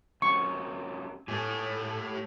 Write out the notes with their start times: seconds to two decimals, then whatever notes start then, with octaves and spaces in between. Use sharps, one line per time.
0.22 F#2 C3 F#3 C#6
1.28 A2 A3 G4 G#5